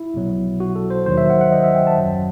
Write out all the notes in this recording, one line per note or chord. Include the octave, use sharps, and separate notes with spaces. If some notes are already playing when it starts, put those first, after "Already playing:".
Already playing: E4
B1 B2 F#3
F#4
A4
C5
D#2 D#3 F#3 C5
E5
F#5
F#5
D#5
E5
G5
A5
G1 F#2 F#3